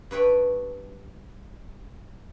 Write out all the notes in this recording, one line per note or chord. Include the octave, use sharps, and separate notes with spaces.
G2 B4 C#5 G5